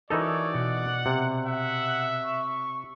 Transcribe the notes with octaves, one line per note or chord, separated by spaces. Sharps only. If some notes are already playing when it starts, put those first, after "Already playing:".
E3 D#4 F#4 A4 A#4 C#5 D5
B2 F#4 F#5
C3
E5 F#5
C#6